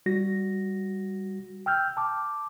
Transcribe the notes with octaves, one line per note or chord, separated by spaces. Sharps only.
G3 F#4 A#6
G5 E6 F6 G6
A5 D6